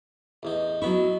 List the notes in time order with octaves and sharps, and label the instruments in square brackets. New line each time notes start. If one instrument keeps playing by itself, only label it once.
[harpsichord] A1 E2 D#4
[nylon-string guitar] F#3 B3 E4 [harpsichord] D#4 B5 C#6